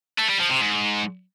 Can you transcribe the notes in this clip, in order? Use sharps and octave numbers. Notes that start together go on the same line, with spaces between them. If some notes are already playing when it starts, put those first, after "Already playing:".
A3
G3
F3
C3
G#2